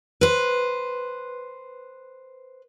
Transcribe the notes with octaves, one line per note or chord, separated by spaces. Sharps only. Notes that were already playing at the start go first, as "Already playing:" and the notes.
B4 C5